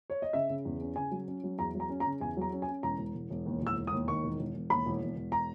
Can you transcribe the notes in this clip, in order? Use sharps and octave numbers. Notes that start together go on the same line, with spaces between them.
C#5
D#5
C#3 E5
C#3
E2
C#4
C#3 G#5
F#3
C#4
F#3
E2 A#5
F#3
A#5
C#4
A#5
C#3
E2 G#5
F#3 A#5
C#4
G#5
C#4
E1 A#5
E1
E1
E1
D#2
E1 E6
E1
D#6
D#2
D#3 C#6
E1
E1
E1
D#2 B5
E1
E1
E1
A#5